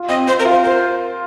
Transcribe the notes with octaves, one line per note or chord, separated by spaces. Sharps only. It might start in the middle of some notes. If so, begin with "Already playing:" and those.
Already playing: F4
C4 D#5
C4 C5
A#4
F4
C5
A#4 C5